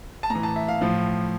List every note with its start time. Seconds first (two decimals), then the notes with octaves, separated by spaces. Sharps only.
0.23 A5
0.30 A2 A#5
0.35 E3
0.43 A5
0.56 E5
0.68 F5
0.81 A2 F3